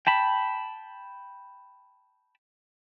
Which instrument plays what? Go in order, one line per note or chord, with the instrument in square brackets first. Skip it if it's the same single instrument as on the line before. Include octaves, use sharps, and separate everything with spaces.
[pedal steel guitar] G5 A5 B5